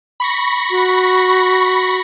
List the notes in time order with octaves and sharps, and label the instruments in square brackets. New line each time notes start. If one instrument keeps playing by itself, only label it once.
[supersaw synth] B5 C#6 A#6
[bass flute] F#4